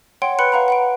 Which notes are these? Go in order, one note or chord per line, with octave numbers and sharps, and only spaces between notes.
C#5 F#5 G5 C6 D7
B4 G5 B5 C6 F#6 C#7
B4 F5 F#5 A#5 B5
F#5 B5 D7